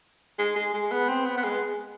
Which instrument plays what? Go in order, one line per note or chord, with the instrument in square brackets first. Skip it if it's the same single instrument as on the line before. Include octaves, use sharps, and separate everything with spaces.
[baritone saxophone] G#3
G#3
G#3
B3
C4
B3
B3
G#3